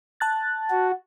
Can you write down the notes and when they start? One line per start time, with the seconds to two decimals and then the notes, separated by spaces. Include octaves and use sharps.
0.20 A5 F#6 A6
0.70 F#4